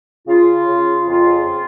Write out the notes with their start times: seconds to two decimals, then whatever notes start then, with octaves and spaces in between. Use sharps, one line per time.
0.27 C#3 F4
0.67 C#3
1.07 F2 F4